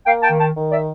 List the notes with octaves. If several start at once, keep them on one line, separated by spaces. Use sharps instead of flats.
A#3 F5 G5
G5 A5
D#3
G5 A5
D#3
D5 E5